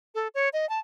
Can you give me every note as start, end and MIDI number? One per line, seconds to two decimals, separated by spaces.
0.15 0.28 69
0.35 0.49 73
0.53 0.68 75
0.69 0.79 81